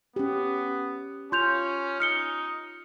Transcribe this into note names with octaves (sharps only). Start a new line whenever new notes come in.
B3 C#4 G4
C#4 F4 C6 G6 F7
D#4 F6 C#7 G7